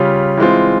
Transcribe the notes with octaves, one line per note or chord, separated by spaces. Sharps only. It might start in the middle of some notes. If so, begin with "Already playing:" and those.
Already playing: C#3 G3 C#4 F4
E3 G#3 C4 F4